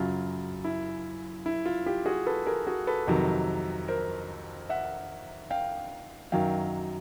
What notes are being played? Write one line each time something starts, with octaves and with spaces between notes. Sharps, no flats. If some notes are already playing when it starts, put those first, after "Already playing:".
Already playing: F#2 C#3 F#3 F4
E4
E4
F4
F4 G4
F#4 G#4
A4 B4
G#4 A#4
F#4 G#4
A4 B4
F2 C3 D#3 F#3
A#4 C5
E5 F#5
F5 G5
F#2 D#3 F#3 F5 G5